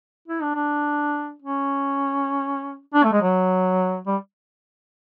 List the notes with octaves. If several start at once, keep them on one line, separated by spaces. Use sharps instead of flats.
E4
D4
D4
C#4
D4
A3
G#3
F#3
G3